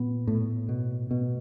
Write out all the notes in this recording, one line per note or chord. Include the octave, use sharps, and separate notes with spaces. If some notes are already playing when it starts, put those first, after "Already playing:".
Already playing: A#2 B3
A2
B2
B2